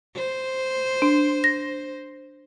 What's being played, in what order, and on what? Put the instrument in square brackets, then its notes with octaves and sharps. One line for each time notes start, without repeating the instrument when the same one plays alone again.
[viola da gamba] C5
[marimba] D4
A#6